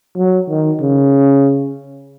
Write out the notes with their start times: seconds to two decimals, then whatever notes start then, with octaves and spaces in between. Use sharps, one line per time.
0.17 F#3
0.50 D#3
0.81 C#3